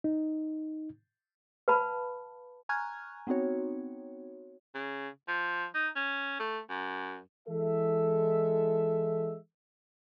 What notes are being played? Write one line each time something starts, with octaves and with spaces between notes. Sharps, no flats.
D#4
B4 F5 A5 B5
G#5 A#5 C#6 F6 F#6 G#6
B3 C4 D#4 F#4 C#5
C#3
F3
D#4
C#4
A3
F#2
E3 G#3 A4 E5